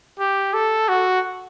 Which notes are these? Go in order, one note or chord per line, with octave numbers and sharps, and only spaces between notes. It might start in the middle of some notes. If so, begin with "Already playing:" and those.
G4
A4
F#4